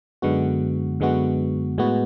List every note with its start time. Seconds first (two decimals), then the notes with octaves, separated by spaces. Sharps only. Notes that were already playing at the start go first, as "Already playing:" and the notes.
0.22 F#2 D3 G#3 B3 F#4
1.00 F#2 D3 G#3 B3 F#4
1.78 A2 G#3 B3 F#4